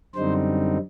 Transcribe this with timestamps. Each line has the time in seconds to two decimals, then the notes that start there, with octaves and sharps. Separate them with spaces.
0.15 F#2 D3 G3 C4 D#4 C5